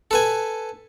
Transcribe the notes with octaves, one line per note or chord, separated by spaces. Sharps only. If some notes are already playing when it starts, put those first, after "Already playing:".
A4 B4 G#5